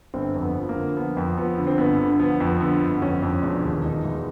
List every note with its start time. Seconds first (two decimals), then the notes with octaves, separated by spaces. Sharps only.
0.14 G1 C4
0.35 F2
0.42 B3
0.55 F3
0.69 A#3
0.76 D3
0.97 F3 B3
1.17 F2
1.37 F3 B3
1.58 D3
1.67 C4
1.78 G1 B3
1.99 D3
2.19 F3 B3
2.40 F2
2.61 D3 B3
2.81 G1
3.02 F2 C#4
3.22 F2
3.33 C#4
3.42 E1 D4
3.64 D#2
3.84 E1 D#4
4.04 E1